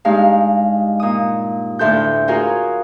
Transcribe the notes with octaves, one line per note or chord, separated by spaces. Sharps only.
G2 G#3 D#4 F5
A#2 D#6
D2 A2 A4 C6 G6
C#4 F4 F#4 G#4 A#4